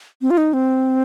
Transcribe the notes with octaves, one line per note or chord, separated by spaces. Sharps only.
C4
F4
D#4
C4